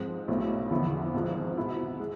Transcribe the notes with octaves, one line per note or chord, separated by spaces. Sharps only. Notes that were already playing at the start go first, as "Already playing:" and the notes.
Already playing: G#2 F3 G#3 C4
B1 B2 A3 E4
E2 D3 F3 B3 E4
G#1 G#2 F3
B2 B3 E4
G#3